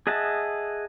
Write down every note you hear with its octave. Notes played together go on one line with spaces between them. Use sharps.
G#4 D#5 E5 F#5 A5